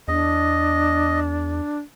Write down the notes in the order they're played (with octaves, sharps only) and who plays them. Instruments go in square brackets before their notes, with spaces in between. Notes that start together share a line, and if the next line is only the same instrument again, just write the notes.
[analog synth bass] E2 [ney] D4 [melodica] D#5